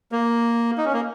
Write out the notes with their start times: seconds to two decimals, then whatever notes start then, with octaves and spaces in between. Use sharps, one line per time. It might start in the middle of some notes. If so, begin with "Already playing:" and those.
0.12 A#3
0.78 D#4
0.85 C#4
0.93 A#3